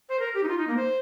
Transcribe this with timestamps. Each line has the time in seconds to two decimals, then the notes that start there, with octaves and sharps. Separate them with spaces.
0.09 C5
0.19 A#4
0.34 G4
0.43 D#4
0.48 F4
0.58 D#4
0.67 A#3
0.77 C5